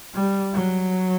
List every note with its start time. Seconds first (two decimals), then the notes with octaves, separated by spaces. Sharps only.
0.14 G3
0.53 F#3